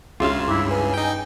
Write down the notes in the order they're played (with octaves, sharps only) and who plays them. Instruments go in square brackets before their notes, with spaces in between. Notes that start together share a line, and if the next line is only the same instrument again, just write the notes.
[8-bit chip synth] C#2 C#3 [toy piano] D4 F#4 G#4 [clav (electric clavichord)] F4 E5 F5
[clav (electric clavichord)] G2 [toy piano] C#4 D6 [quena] E4
[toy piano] B4 A#5 D#6 [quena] G#5
[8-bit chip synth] D#4 G5